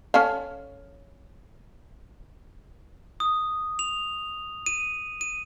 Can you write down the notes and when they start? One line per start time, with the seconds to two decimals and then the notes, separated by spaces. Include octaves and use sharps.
0.14 C#4 A4 F5
3.20 D#6
3.79 F7
4.66 D#7
5.21 D#7